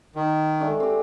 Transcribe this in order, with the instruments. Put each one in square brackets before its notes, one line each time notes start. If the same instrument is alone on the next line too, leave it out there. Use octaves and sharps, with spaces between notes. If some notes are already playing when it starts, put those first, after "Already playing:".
[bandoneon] D#3
[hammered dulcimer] G#3 A3 D4
C4 G4